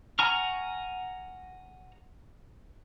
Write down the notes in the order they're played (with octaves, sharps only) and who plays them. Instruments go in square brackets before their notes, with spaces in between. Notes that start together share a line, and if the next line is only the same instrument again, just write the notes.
[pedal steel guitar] F#5 G#5 A#5 C#6 F6